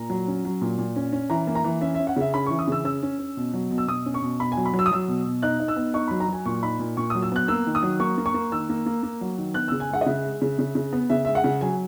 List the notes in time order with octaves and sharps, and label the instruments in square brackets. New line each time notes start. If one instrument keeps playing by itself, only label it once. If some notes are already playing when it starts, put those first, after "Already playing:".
Already playing: [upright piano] A#2 A#5
F#3
C#4
F#3
A#2
A#2
C#4
C#4
E3 A#5
A#3
A#5
E3
C#4 E5
E5
C#4
F#5
C#3 E5
C#4 B5
E3 C#6
D#6
C#3 E6
C#4 E6
C#4
C#4
B2
F#3
B2
E6
B2 D#6
C#4
C#6
B2
B2 B5
G#5
F#3
B5
F#3
E6
D#6
F#3 E6
B2
B2
D#4 F#6
D#4
E6
B3
D#4 C#6
F#3 B5
A#5
F#3 G#5
A#2 C#6
D#4 B5
A#2
A#2 C#6
D#6
F#3
E6
B3 F#6
A#3 E6
D#3
D#6
F#3
A#3 C#6
A#3
C#6
A#3
D#3 E6
A#3
A#3
A#3
F#3
D#3
B3 F#6
C#3 E6
G#5
G#3 F#5
D#5
C#3 E5
G#3
C#3
C#3
C#3
B3
C#3 E5
G#3 E5
F#5
C#3
F#3 G#5